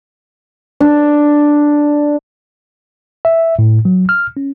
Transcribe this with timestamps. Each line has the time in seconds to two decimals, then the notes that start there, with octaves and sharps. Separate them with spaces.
0.80 D4
3.25 E5
3.59 A2
3.85 F#3
4.09 F6
4.37 C#4